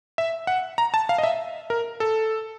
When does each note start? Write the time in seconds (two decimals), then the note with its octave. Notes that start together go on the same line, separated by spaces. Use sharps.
0.18 E5
0.47 F#5
0.78 A#5
0.94 A5
1.09 F5
1.18 D#5
1.23 E5
1.70 A#4
2.00 A4